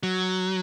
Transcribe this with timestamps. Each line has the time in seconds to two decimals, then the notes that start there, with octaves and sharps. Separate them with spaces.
0.03 F#3